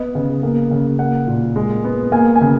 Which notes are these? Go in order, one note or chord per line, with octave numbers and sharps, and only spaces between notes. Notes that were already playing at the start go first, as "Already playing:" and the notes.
Already playing: B3 D#5
C#3
A#3
C#3
A#3 F#5
A#2
G#3
B3
A#3 G#5
G#5
C#3